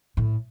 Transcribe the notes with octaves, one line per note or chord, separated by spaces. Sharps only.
A2